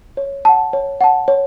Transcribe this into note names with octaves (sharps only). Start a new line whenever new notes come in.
C#5
F#5 A5
C#5
F#5 A5
C#5